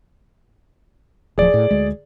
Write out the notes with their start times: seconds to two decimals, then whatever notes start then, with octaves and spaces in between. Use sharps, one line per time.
1.38 D1 F3 G#4 D5
1.54 A2
1.71 D2 G#3